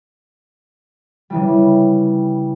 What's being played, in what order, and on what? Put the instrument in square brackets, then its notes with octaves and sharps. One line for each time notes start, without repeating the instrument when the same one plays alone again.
[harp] C#3 E3 G3